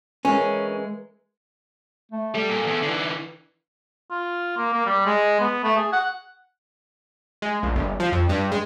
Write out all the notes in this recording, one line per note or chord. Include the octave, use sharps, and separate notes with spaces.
E3 G#3 C#4 A#4
A3
G3 A4
A#2
E2
D3 E3
F4
A#3
A#3
G3
G#3
B3
A3
G#4
F#5
G#3
A#1
G1
F3
F2
G2
G#3